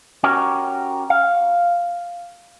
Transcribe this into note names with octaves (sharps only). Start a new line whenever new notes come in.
C#4 F#4 G4 A#4 C#5
F5